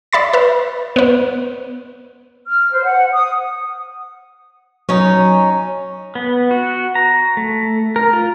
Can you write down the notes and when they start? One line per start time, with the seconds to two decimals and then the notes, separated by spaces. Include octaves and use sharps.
0.13 D5 E5 B5 A6
0.33 B4 E5
0.96 B3 B4
2.45 F6
2.72 C5
2.83 F#5
3.13 D#6
4.89 F#3 C#4 D#4
6.15 B3
6.51 F#4
6.95 A#5
7.37 A3
7.96 A#4
8.13 F4